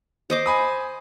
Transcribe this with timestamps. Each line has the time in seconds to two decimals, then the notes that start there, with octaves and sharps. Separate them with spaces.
0.30 C5 D#5 D6
0.46 G#5 B5 D#6